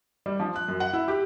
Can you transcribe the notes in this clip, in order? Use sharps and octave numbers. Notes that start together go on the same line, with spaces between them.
G3
F3
F#6
F#2
F#5
E4
G4